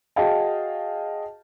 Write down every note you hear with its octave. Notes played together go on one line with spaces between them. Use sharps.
F#4 G#4 D#5 F5 G5 A5